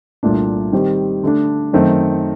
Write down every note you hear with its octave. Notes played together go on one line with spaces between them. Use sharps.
C2 A#2 A3 D4
D#3 G3 C4 G4
D3 A3 D4
F#2 D#3 A3 C4